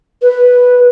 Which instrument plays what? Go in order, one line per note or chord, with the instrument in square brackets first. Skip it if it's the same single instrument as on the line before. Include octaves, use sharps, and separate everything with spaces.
[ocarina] B4